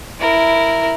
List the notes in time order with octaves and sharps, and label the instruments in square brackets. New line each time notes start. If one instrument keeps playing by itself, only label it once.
[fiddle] E4 A#4